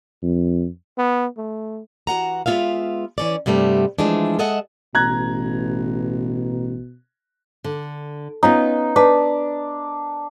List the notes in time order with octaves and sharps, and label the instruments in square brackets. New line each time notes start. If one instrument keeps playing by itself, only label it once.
[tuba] F2
[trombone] B3
A3
[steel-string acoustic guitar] E3 F#4 F#5 A#5
G#3 B3 C#4 F4 E5 F5
E3 C#4 D5
G2 C3 G3 A3 B3
E3 F3 G#3 A3 D4
G#3 A4 D#5 E5 F#5
[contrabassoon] A1 [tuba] B2 [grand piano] A#5 F#6 G#6
[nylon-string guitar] D3
[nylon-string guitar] B3 C#4 F4 [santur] D#4
[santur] D4 [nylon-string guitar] B4